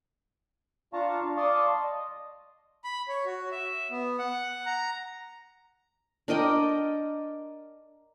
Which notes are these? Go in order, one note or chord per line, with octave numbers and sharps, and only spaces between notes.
D4 F4 F5 A5 A#5 C#6
D5 F5 A5 C6 C#6 D#6
D#5
B5
C#5
F#4
E5
B3
F#5
A#5
D4 A#4 D#5 G5